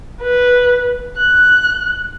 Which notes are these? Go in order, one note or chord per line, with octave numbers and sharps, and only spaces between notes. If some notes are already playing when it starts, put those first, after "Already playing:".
B4
F#6